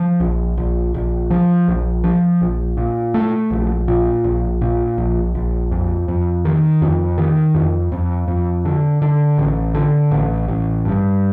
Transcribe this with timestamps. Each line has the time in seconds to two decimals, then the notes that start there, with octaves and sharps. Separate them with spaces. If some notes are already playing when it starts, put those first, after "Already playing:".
Already playing: F3
0.20 A#1
0.57 A#1
0.94 A#1
1.30 F3
1.68 A#1
2.04 F3
2.41 A#1
2.77 A#2
3.14 A3
3.51 A#1
3.88 A#2
4.24 A#1
4.62 A#2
4.98 A#1
5.35 A#1
5.71 F2
6.08 F2
6.45 D#3
6.82 F2
7.18 D#3
7.55 F2
7.92 F2
8.28 F2
8.65 D3
9.02 D3
9.38 A1
9.74 D3
10.11 A1
10.48 A1
10.85 G2